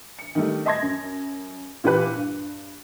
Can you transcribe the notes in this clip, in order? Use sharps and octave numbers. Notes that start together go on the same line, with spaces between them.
C#7
D#3 G3 A3
D#5 E5 A5 C6 G#6 A#6
F#2
A#2 E3 G4 B4 F#6
G2